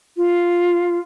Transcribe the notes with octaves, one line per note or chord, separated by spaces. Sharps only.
F4